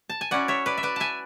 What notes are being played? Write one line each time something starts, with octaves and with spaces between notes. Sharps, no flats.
A5
G#5
F#3 C#4 E4 D5 F#5
C#5 E5
B4 D5
E5
B4 D5
E5 G#5 A5